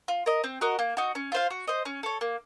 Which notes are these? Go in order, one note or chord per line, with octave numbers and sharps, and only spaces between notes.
F4
A#4 D#5
C4
F#4 A#4 D#5
A#3
D#4 F#4
C#4
F4 C5 F5
F#4
C5 D#5
C#4
A4 C#5
A#3